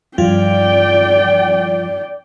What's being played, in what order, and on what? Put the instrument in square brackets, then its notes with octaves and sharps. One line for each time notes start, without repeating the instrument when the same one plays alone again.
[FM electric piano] G2 F3 F4 [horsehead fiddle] D5 G5